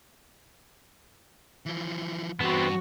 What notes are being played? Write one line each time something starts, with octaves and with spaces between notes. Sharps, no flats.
E3 F3
E2 G2 B3 C4 F#4 A5